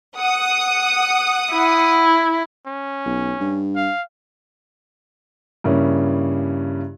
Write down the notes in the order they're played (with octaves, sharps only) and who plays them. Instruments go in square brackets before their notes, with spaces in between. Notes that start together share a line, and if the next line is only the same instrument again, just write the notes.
[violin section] F#5 D#6
[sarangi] E4
[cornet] C#4
[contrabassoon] B1
G2
[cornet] F5
[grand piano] G2 C#3 A#3 C#4 E4